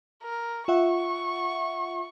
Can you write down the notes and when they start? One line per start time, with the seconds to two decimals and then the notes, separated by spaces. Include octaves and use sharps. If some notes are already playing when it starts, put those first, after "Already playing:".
0.23 A#4
0.68 F4 E5 F#5 C#6